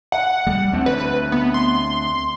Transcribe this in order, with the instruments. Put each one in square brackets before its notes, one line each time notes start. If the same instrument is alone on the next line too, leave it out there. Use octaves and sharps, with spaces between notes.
[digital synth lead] F#5
[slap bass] G3
D2 C4
[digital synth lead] B4
B3
C6